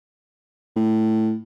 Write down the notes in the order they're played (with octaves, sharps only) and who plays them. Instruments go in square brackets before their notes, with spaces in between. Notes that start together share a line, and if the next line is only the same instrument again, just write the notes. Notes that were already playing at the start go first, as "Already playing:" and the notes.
[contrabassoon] A2